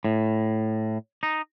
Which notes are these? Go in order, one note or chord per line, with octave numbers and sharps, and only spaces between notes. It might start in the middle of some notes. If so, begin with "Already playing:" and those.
A2
D#4